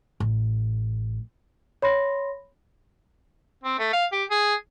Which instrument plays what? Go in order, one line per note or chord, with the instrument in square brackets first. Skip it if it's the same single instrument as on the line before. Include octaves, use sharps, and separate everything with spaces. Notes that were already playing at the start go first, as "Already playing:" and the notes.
[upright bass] A1
[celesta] C#5 B5 C6 A#6
[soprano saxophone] C4
A3
F5
G4
G#4